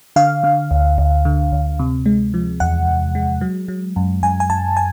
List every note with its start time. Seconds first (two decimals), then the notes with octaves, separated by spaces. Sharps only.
0.16 D3 F5
0.43 D3
0.71 D2
0.98 D2
1.25 D3
1.52 D2
1.79 C3
2.06 G#3
2.34 F3
2.60 E2 F#5
2.88 E2
3.15 G#3
3.41 F#3
3.68 F#3
3.96 F#2
4.23 F#2 G#5
4.40 G#5
4.50 F#2 A5
4.77 G#5